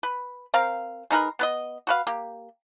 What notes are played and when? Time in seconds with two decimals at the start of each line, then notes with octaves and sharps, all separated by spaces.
0.03 B4
0.54 C4 A#4 F5
1.10 G#3 D#4 A#4 B4
1.39 B3 B4 D#5
1.87 F#4 B4 F5
2.07 A#3 G4